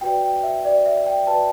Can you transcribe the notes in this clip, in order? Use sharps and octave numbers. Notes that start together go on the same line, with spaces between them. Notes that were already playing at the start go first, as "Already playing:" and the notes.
F#4 B4 D5 G5
G5
E5
F#4 B4 D5
E5
G5
F#4 B4 D5 A5